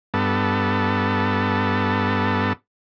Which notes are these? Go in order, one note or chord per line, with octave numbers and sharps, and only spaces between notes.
G2 B3 A4